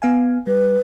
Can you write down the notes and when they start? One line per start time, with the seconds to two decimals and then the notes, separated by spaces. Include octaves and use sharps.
0.02 B3 F5 G#5
0.47 G3 B4